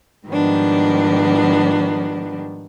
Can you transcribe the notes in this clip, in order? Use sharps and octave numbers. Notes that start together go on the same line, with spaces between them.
G#2 D#3 F3 G3 B3 D4